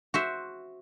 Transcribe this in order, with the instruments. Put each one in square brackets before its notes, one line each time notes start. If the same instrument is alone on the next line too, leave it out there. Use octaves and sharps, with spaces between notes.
[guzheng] F#4 C5 E5